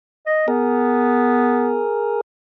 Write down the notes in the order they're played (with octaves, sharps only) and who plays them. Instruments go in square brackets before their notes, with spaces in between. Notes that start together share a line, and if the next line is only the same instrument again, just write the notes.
[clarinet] D#5
[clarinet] B3 [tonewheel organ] G#4 A#4